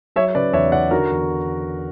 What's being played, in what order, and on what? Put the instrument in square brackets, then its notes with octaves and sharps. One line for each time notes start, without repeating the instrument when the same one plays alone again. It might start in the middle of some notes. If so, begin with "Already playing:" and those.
[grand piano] F#3 C#5 E5
C#3 B4 D5
E2 C#5 E5
C#3 D5 F#5
D3 F#4 A#4
E2